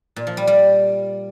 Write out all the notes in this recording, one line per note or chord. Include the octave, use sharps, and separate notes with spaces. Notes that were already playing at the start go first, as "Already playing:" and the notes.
A#2
F3
G3
G3